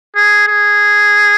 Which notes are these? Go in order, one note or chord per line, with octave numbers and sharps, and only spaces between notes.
G#4
G#4